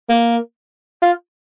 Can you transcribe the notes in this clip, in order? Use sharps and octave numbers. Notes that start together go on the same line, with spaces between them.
A#3
F4